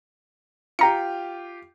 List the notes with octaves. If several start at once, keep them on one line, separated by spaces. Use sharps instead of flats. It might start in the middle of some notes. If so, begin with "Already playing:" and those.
F4 G4 A#5 C#7